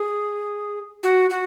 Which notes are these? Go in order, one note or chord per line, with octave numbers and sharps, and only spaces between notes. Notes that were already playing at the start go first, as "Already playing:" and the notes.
Already playing: G#4
F#4
F#4